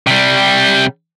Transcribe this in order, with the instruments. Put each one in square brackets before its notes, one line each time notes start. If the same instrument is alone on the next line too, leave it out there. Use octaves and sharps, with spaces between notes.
[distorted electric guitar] C3 G3